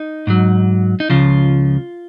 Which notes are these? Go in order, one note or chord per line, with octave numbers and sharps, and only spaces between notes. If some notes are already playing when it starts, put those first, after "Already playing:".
Already playing: D#4
G#2 F#3
D#4
C#2 C#3 F3 F4